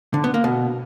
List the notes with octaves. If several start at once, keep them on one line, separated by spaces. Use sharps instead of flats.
D3
B3
A#3
B2